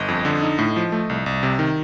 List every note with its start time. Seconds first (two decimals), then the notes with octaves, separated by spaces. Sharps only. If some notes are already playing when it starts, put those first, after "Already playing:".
Already playing: G1 D#5
0.08 F2
0.25 D3
0.42 D#4
0.58 A2
0.76 F3
0.92 A3
1.10 C2
1.26 C2
1.43 C3
1.59 D#3